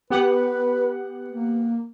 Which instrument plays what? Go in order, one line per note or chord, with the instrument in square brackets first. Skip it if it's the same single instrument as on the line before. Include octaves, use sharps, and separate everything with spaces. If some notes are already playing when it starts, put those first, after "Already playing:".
[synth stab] B3 G4 F#5 [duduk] B4
[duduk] A#3